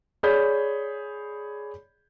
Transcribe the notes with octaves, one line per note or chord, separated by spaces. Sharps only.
G#4 C#5 D5 B5 G6